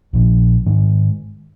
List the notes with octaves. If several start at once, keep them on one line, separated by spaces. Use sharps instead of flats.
A#1 A#2 F3
G#2 D#3 G#3